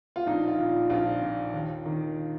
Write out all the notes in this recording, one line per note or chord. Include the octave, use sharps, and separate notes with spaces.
F4
A#1 D#4
F4
A#2
A#1 F4
A#2
D#2
D#3